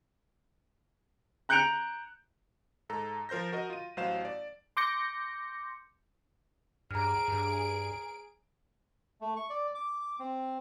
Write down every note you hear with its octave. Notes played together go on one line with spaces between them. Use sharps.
A#5 F#6 G6 C#7 D7 F7
G#2 A4 A#5
F3 A#4 C5 G6 A#6
F#4 A#4 D#5
F4 D#7
A1 F#3 C5 F5 E7
D5
C6 D6 G6 A#6 C#7
G2 G#4 A#5 F6 D7
G2
A3
C#6
D5
D6
C4